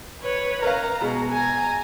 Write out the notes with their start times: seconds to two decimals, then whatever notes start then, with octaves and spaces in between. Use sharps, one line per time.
0.21 B4 C#5
0.62 A#4 B4 F5 A#5
1.01 B2 G#3
1.32 G#5 A#5